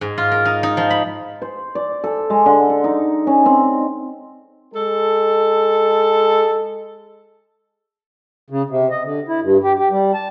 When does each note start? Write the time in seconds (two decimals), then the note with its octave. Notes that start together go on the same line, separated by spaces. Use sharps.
0.01 G#2
0.18 F4
0.32 A#4
0.45 D#4
0.63 D#4
0.77 F3
0.90 B5
1.42 C5
1.75 D5
2.04 A4
2.30 G#3
2.46 D3
2.69 A4
2.84 D#4
3.27 C#4
3.46 C4
4.73 G#3 A4
8.50 C#3
8.70 C3
8.91 D#5
9.04 D3
9.28 E4
9.42 G2
9.63 G4
9.79 G4
9.91 G3
10.14 A5